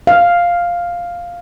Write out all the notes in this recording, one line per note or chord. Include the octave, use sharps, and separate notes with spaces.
F5